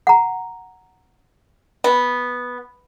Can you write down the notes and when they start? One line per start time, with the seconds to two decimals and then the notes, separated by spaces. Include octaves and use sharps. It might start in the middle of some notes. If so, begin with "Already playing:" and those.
0.07 F#5 A#5
1.84 B3